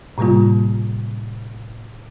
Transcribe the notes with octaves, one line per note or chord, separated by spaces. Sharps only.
A2 C3 G3 A#3 F4